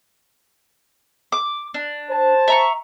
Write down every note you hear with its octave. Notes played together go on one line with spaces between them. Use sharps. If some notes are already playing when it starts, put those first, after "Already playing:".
D6
D4
C5 A5
E5 A#5 C#6